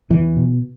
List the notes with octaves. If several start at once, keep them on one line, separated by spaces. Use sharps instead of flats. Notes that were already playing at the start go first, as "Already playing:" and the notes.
E2 E3
B2